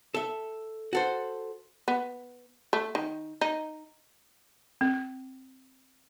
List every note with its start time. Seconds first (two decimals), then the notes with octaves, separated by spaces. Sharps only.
0.14 A4 E5
0.93 F#4 A4 C5
1.88 B3
2.73 A3
2.95 D#3
3.41 D#4
4.81 C4